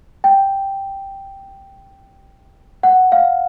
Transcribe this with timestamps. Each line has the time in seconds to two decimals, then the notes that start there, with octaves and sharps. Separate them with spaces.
0.24 G5
2.83 F#5
3.12 F5